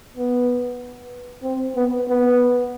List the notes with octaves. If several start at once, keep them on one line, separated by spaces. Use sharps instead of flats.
B3
C4
B3
B3